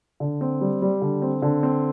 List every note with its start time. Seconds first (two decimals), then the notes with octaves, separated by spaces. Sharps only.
0.20 D3
0.41 C4
0.61 G3
0.82 G3
1.02 D3
1.22 C4
1.42 D3
1.63 C4